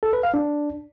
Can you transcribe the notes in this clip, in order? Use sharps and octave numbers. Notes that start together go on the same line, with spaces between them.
A4
B4
F5
D4